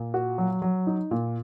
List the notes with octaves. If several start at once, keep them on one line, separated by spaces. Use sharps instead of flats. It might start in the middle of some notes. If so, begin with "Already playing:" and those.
Already playing: A#2
F#4
F#3
F#3
D#4
A#2